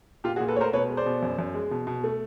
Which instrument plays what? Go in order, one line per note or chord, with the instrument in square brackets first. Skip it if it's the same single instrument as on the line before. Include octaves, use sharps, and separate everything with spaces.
[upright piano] A#2 F4 G4
F#4 G#4
A#2
A4 B4
A3 A#4 C5 C#5
B2 B4 C#5
G#3
C5 D5
B2
F#2
F#2
G#3
B2
B2
A3